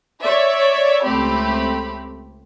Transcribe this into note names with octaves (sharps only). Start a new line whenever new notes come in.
C#5 D5 E5
C#2 A3 C4 G4 B5